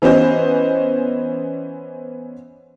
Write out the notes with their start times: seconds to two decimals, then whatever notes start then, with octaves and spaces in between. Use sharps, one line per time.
0.02 E3 B3 C#4 C5 D#5